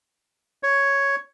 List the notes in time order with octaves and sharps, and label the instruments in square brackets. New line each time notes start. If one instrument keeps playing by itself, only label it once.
[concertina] C#5